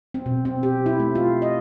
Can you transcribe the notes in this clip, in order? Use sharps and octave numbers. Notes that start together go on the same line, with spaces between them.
C4
B2
C4
G4
E4
A3
F4
D#5